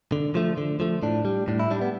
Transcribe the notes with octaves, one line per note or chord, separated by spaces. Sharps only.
D3
F3 A3
D3
F3 A3
A2 D4
G3
A2 D4
E4
G3 D4
B3